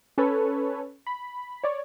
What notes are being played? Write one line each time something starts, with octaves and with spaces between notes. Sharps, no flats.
C#4 A4 B4 C#5
B5
C#5 D5